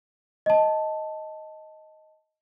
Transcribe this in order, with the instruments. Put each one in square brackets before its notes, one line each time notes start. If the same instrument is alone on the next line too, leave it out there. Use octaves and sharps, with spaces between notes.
[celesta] D#5 A5